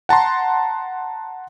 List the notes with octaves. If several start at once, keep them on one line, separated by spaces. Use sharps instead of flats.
F#5 A5 A#5 C6